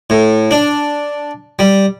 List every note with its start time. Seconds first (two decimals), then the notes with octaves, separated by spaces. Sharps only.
0.10 A2
0.51 D4
1.59 G3